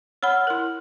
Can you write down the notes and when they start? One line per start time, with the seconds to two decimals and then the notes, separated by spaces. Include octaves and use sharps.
0.23 C#5 F#5 B5 E6 F6
0.47 E4 A#4